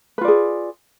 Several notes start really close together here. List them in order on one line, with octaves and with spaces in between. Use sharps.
B4 F4 D5 G#4